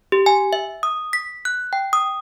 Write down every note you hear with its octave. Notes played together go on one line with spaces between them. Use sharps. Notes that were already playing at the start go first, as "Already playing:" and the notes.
G4
G#5
E5
D#6
B6
F#6
G5
D#6